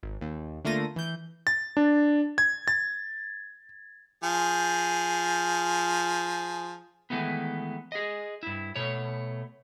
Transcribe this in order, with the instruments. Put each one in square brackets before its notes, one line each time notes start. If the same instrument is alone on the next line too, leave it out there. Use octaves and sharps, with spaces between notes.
[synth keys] G#1
D#2
D3 A3 A#3 F4 A#6 D#7
E3 G6
[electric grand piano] A6
D4
G#6
A6
[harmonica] F3 G#4
[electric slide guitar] D#3 E3 G#3 A3 B3
G#4 D#5
G2 E4
B2 A3 C#5